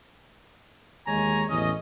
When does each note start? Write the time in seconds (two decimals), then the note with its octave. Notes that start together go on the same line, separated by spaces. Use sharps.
1.07 D#2 G#3 C#5 G#5 A#5
1.49 A1 E2 C#4 D#5